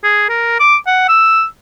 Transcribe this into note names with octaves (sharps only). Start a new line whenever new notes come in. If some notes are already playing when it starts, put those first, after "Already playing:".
G#4
A#4
D6
F#5
E6